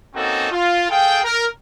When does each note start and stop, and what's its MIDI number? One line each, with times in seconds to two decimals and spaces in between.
0.15 0.48 58
0.15 0.48 60
0.15 0.48 61
0.15 0.48 63
0.15 0.48 66
0.15 0.48 69
0.51 0.88 65
0.89 1.19 68
0.89 1.19 69
0.89 1.19 77
0.89 1.19 79
1.23 1.45 70